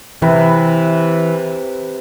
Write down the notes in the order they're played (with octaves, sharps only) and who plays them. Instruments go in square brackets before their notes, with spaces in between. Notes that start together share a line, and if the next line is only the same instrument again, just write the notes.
[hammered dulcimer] C3 B4 [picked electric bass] E3